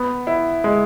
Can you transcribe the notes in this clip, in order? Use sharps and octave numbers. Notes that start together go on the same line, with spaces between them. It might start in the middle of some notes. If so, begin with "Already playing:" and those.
Already playing: B3
E4
G#3